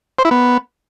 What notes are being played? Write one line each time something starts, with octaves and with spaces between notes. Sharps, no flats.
C5
E4
B3